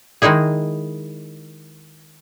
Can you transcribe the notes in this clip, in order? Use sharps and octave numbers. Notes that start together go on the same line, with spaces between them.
D#3 G#3 D#4 E4 G#4